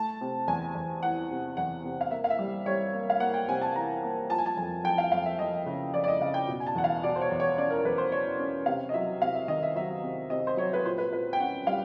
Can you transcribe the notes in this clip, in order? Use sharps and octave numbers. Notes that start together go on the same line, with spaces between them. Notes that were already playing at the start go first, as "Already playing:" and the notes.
Already playing: A3 A5
C3
E2 G#5
E2
E3 F#5
C3
E2 F#5
C3
F5
A#3 E5
F5
E5
G3
G3 C#5
A#3
F5
A#3 F#5
G5
C3 G#5
A5
E3 A#5
A#3
F3 A5
G#5
A5
F2 G#5
F2 G5
F5
F2 F5
E5
F2 D#5
C#3
F2 D5
D5
D#5
C#3 F5
G5
B2
G#5
A5
E2 F#5
F5
B2 D5
C5
C#5
E2
C#5
C#4 D5
A#4
E2 B4
C5
C#4 C#5
C#4
C3 F5
D#5
F#3 E5
C3 F5
E5
D#3 D#5
E5
F#3 E5
C3
C3 D#5
C5
F#3 C#5
B4
A#2 C5
B4
A#2 B4
G5
C#4 F#5
G3 F5